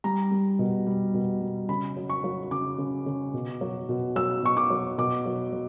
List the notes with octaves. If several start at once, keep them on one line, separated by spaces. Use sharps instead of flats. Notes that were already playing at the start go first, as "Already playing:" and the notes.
G3 A#5
G3
B2
G3
B2
G3
C#3 B5
F#3
C#6
F#3
C#3 D6
C#3
C#3
B2
F#3
B2
F#3 E6
B2 C#6
D6
F#3
B2 D6
F#3
F#3